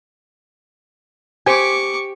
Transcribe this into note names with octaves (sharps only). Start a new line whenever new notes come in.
G4 C5 G#5 C#6 D6